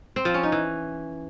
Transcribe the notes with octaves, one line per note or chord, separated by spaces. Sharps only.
C4
F3
C#4
D#4
E3